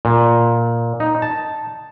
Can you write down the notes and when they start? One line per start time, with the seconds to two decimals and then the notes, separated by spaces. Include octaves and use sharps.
0.05 A#2
1.00 D#4
1.22 A5